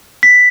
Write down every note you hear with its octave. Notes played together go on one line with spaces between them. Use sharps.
B6